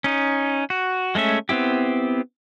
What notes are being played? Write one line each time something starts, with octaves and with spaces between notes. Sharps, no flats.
C#4 D#4
F#4
G#3 A3 C#4 E5
B3 C4 E4 G4